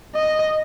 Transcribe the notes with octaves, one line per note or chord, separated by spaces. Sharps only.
D#5